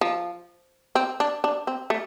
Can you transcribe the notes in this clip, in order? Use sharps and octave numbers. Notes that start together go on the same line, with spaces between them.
F3
C4
D4
D4
C4
A3